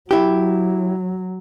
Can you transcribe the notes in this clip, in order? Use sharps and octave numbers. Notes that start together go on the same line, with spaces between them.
F#3 E4 G4